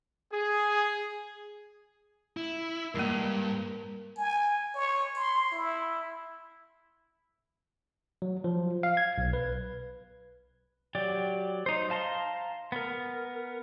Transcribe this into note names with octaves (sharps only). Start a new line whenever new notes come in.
G#4
E4
E2 G2 G#3 A#3 A#4
G#5
C#5
C6
E4
F#3
F3
F5
G#6
B1
B4
F#3 G4 D5
D#4 C5
F5 A5 A#5 C6
B3 A#4